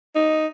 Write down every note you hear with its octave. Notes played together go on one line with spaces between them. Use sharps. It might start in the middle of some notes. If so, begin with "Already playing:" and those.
D#4